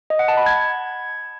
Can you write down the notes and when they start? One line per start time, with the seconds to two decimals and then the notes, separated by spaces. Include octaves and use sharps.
0.10 D#5
0.19 F#5
0.28 A5
0.37 B5
0.46 G#6